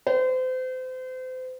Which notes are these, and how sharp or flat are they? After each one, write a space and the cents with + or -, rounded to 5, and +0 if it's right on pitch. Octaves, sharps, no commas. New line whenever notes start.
C5 -35